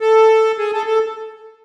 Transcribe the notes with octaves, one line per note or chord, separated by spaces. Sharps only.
A4
G#4
A4
A4